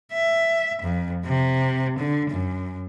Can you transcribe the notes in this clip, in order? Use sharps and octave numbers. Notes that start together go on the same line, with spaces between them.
E5
F2
C3
D3
F#2